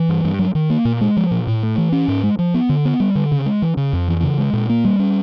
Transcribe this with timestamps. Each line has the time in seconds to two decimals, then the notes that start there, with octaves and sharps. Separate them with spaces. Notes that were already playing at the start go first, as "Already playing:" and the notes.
Already playing: E3
0.09 G2
0.24 G2
0.39 F#3
0.55 D#3
0.70 A#3
0.85 A#2
1.01 G#3
1.17 F3
1.31 A#2
1.47 A2
1.63 A3
1.78 E3
1.92 C#4
2.08 G#2
2.23 G#3
2.39 F3
2.54 B3
2.69 D3
2.85 B3
3.00 G3
3.15 D3
3.32 C#3
3.46 G#3
3.62 E3
3.77 C#3
3.93 F2
4.08 E3
4.23 C#3
4.38 G#3
4.53 A#2
4.69 A#3
4.85 G3
4.99 C#4